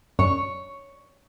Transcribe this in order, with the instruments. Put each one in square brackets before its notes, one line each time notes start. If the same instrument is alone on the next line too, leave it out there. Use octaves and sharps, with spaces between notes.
[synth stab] F#2 [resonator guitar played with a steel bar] C#5